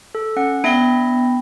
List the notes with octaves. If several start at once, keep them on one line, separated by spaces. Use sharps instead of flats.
A4
C#4 F#5 C#7
B3 D4 E5 G5 A#6